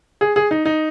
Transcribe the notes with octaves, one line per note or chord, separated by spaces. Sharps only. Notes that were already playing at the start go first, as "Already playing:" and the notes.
G#4
G#4
D#4
D#4